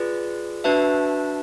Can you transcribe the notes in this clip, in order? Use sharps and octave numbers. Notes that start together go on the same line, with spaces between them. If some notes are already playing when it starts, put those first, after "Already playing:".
Already playing: F4 G#4 B4 D5
D4 F#4 B4 E5 A5